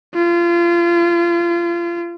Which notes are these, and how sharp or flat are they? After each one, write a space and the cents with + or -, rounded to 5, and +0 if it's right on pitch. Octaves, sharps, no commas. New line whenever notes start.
F4 -30